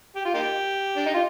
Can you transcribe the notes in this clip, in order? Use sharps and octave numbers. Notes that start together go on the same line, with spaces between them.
G4
F4
A#3 D#4 G4
D4
D#4
F4